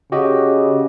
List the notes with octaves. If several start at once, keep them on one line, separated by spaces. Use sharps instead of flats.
C#3 F#4 G4 D#5